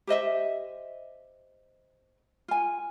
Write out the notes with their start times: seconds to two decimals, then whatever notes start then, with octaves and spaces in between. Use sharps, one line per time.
0.07 G4 C5 D#5 E5
2.48 F4 G#5